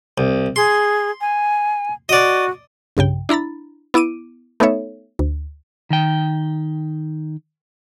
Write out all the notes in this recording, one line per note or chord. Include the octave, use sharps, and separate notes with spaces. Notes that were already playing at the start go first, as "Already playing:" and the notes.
C2
G#4 C6
G#5
F#4 D5 D#5
B1 G2 C#3 G5
D4 E4 A#5 B5 A6
B3 E4 D6 D7 D#7
A3 B3 D#4 A4 C#5 E5
D2
D#3 G5